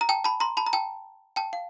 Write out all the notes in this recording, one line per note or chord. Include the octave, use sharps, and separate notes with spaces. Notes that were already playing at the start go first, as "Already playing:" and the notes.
A#5
G5 A5
A5 B5
A#5 C6
A5 B5
A#5
G5 A5
G5 A5
F5